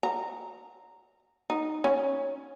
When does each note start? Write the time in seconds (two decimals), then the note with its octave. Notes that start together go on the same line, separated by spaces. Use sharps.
0.03 A#5
1.50 D#4
1.84 C#4